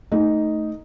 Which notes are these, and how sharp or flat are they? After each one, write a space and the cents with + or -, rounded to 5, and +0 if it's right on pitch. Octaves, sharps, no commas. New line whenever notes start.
A3 +0 D#4 +0